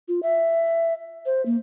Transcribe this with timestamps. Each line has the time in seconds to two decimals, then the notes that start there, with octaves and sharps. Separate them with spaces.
0.08 F4
0.23 E5
1.26 C5
1.46 A#3